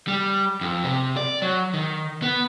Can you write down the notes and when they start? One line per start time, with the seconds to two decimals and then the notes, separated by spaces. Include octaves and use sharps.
0.08 G3
0.61 F2
0.84 C3
1.17 D5
1.42 F#3
1.74 D#3
2.22 B3